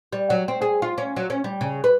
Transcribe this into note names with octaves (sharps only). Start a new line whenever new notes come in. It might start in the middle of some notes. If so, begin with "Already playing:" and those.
G3
F#3
C4
G#4
F4
C#4
F#3
C#4
G3
C#3
B4